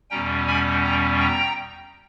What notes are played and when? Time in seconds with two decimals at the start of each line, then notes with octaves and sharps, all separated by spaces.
0.10 E2 B2 G3 C#4 G5 A#5
0.47 G#5 B5
0.84 G5 A#5
1.20 G5 A#5